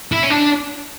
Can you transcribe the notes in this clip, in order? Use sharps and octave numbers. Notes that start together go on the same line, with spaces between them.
E4
C#4
D4